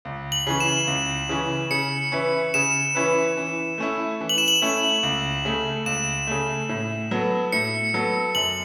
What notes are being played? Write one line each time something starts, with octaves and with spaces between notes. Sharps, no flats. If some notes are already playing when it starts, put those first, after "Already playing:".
C#2
F#7
C#3 E3 C#4
E7
C#2
C#3 E3 C#4
C#3 C#7
E3 C#4 E4 B4
C#3 E7
E3 C#4 E4 B4
E3
A3 C#4 E4
E3
F#7
E7
F#7
A3 C#4 E4
C#2
C#3 A3
C#2 E7
C#3 A3
A2
F#3 B3 A4
A2 C#7
F#3 B3 A4
F#2 F#7